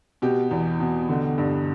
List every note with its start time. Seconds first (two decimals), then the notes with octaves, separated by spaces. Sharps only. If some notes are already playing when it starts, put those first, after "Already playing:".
0.22 B2 G4
0.51 E2
0.80 B2
1.09 D3
1.38 G2